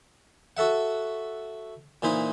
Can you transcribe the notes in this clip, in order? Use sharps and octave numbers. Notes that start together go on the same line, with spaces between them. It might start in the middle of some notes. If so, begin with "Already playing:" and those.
F#4 A4 E5 F#5
A#2 E3 D#4 C5 B5 D#6